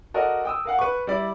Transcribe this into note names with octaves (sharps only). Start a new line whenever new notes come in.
F#4 A4 A#4 D5 D#5
G5 D#6 E6
A#4 F5 F#5
B4 C#6
G3 E4 D5